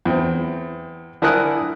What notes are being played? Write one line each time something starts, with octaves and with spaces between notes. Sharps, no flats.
E2 C4
D3 E4 A#4 G#5 D#6 F#6